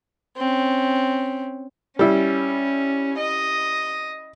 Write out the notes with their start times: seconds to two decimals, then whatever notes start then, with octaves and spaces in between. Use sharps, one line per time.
0.37 C4 C#4
1.99 G3 C#4 E4
3.17 D#5